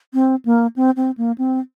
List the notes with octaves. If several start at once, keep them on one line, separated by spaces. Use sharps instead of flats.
C4
A#3
C4
C4
A#3
C4